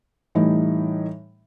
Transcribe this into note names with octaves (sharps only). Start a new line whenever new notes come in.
A2 E3 G3 D#4